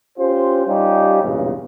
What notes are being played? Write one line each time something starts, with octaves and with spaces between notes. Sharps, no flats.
C#4 F4 G4 C5
G3 C#4 D#4 F4 G4
B1 E2 G2 A#2 C#3